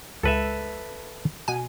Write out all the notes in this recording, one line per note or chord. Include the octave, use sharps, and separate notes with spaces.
C#2 A4 B4 E5
B2 G#5